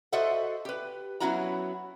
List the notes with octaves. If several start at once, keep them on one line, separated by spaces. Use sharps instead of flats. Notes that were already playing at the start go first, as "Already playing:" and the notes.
F#4 A4 C5 D#5 E5 F#5
G4 B4
F#3 B3 C#4 E4 F#4 A#5